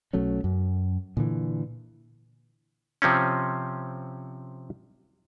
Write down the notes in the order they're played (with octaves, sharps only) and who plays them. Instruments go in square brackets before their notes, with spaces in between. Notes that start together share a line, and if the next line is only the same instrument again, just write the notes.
[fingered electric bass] B1 F#3 A3 C#4
F#2
A#2 D3 E3
[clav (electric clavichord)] C3 F3 C4 C#4